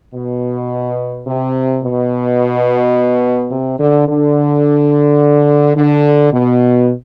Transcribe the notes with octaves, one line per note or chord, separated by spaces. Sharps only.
B2
C3
B2
C3
D3
D3
D3
B2